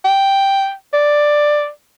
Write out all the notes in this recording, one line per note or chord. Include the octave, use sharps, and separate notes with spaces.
G5
D5